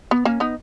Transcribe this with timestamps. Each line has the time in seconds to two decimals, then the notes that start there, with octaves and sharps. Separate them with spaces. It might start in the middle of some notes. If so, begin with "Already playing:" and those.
0.11 B3
0.25 A#3 C#4
0.40 B3 D#4